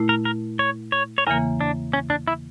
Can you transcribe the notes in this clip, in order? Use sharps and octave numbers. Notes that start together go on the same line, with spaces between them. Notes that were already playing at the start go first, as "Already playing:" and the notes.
Already playing: A#2 A3 E4
A#4
A#4
C#5
C#5
C#5
E2 C#3 E3 A#3 A#4
D4
C#4
D4
E4